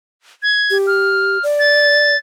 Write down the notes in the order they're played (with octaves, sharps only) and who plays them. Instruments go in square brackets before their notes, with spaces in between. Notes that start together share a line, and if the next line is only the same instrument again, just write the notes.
[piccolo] G#6
[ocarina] G4
[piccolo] F6
[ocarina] D5
[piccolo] A6